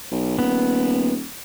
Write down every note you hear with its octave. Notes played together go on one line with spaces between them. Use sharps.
B1
D#1 B3